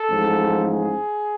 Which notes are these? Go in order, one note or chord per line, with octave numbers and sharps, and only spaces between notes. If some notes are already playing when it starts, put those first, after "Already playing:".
Already playing: A4
A1 G#2 F3
G#4